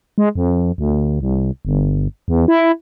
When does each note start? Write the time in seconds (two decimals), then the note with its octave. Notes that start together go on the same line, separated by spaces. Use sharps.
0.18 G#3
0.35 F2
0.78 D2
1.20 C2
1.65 G1
2.28 E2
2.48 E4